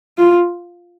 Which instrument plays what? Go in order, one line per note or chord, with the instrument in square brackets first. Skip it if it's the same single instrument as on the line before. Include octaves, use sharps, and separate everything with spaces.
[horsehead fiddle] F4